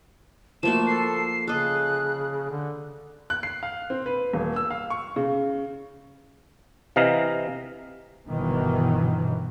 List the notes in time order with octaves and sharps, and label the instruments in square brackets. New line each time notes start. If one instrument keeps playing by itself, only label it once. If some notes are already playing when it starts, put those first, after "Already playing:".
[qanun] F3 A#3 F#4 [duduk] A3 [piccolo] E7
[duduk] A4 [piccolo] C7
[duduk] C#3 [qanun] A4 D#5 [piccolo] F#6
[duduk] D3
[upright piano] F#6
C7
F5
C4
B4
D#1
E6
F5
C#6
C#3
[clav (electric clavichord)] C3 E3 D#5 F5 A#5
[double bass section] G1 B2 D#3 E3